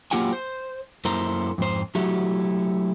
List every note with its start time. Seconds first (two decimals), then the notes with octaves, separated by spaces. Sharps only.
0.11 F#3 A#3 F4 G4 F#5 G#5
0.32 C5
1.05 F#2 A#3 E4 A4 C5 A#5
1.58 F2 G#2 C5
1.95 F#3 A3 E4 F#4 G4